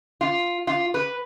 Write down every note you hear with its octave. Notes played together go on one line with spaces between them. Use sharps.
F4
F4
B4